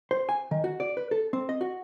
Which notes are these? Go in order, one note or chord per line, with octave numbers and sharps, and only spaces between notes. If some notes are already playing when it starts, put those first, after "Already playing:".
C5
G#5
D#3
F#4
D5
B4
A4
C4
D#5
F#4